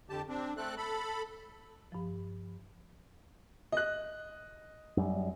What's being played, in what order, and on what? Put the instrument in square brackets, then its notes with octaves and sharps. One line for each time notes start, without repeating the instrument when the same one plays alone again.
[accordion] F2 D3 G4 A5
C4 D4
A3 C4 A4 F#6
A4 B5
[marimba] G2 F3
[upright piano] D#5 F#6
[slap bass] F#2 G3